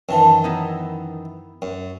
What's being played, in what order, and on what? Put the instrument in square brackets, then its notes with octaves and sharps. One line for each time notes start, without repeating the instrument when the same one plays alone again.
[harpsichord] F#2 D#3 E3 [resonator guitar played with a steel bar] A5
[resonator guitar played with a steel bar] B3 D#4 E4
[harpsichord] F#2